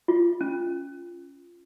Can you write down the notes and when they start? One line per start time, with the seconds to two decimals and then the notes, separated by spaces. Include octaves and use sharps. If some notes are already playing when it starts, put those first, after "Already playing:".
0.08 F4
0.41 C#4